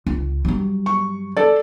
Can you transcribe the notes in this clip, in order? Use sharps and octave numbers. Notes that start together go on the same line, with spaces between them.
C#2
G2 F#3
C#6
A4 D5